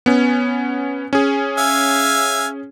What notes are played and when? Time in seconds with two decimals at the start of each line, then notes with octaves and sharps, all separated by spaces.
0.06 B3 C#4
1.13 C#4 G#4
1.58 E5 F5 G#5